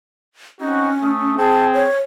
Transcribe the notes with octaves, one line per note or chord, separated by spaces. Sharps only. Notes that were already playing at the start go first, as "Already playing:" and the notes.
C4 C#4 D#4 F#4
A3 D#6
C4 G#4 A5
C#5